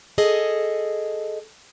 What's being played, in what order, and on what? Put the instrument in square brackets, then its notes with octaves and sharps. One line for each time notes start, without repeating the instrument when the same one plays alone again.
[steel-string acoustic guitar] G#4 A4 D#5